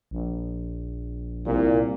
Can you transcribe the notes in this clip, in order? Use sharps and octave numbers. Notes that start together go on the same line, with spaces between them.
A#1
C2 A#2